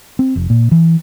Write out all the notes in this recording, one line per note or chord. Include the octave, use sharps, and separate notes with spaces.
C4
F1
A#2
E3